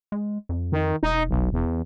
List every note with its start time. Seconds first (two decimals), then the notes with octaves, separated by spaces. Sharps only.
0.12 G#3
0.49 F2
0.72 D#3
1.03 E1 D#4
1.29 B1
1.53 E2